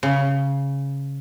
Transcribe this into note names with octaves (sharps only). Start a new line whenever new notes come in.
C#3